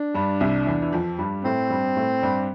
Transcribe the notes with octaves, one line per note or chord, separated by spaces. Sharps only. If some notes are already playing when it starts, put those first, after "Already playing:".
Already playing: D4
G2 G3
C2 C3
E2 E3
E3
F2 F3
G2 G3
A2 A3 C4
G2 G3
A2 A3
G2 G3